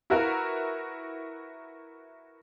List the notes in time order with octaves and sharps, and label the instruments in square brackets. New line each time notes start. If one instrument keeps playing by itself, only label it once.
[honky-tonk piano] E4 F#4 A#4 B4 A#5